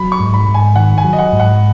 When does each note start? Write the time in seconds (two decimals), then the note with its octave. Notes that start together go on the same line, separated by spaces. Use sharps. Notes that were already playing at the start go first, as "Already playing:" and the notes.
Already playing: F#3 B5
0.12 C#6
0.20 G#2
0.34 B5
0.48 G#2
0.54 G#5
0.76 D#3 F#5
0.98 G#5
1.04 F#3
1.13 D#5
1.19 F#5
1.33 G#2
1.40 F#5